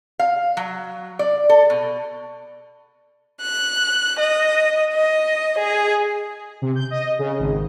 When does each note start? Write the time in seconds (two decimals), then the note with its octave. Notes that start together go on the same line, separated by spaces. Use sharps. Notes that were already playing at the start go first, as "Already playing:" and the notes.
0.19 F5
0.57 F#3
1.19 D5
1.49 A4
1.70 B2
3.41 F#6
4.19 D#5
4.94 D#5
5.58 G#4
6.62 C3
6.75 G6
6.90 D#5
7.19 C#3
7.39 G#1